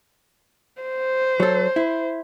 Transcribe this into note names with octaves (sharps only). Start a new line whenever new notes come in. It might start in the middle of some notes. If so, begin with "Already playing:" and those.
C5
F#3 A4
E4